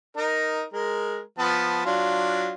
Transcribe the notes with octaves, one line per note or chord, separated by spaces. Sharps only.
D#4 A#4
G#3 A#4
F3 B3 A5
F#3 D4 F4